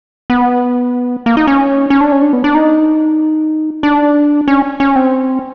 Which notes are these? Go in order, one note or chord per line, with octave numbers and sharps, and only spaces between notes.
B3
A#3
D#4
C#4
C#4
D4
C#4
D4
B3
D4
D#4
D4
C#4
C#4
C4